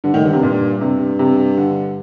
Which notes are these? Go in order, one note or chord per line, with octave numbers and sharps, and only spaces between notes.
G2 D3
A2 D#3
G2 D3
C3
A#2
G2 C3
C3
D3